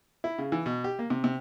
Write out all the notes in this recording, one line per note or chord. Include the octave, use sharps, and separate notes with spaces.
E4
C#3
E3
B2
G4
A#3
C3
C3